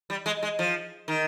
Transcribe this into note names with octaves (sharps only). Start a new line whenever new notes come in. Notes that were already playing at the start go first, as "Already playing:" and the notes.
G3
G#3
G#3
F3
D#3